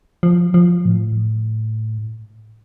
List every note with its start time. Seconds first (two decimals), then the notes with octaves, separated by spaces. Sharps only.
0.23 F3
0.54 F3
0.85 A2